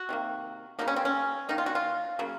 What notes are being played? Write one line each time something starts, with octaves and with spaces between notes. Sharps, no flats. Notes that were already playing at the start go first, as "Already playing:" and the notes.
Already playing: F#4
C3 D#3 A#3
C#3 F#3 A#3 D#4
C#4
C4
C#4
D#3 A#3 D#4
F4
F#4
F4
C#3 F#3 A#3